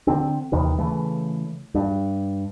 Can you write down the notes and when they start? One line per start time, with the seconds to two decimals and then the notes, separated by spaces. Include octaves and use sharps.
0.07 D3 C4
0.52 D#2 C3 D#3 E3
0.78 C#3 E3 A3
1.75 G2